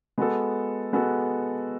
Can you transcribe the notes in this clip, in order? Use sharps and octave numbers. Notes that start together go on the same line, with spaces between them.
G#3 B3 F#4 A4
G#3 B3 F#4 A4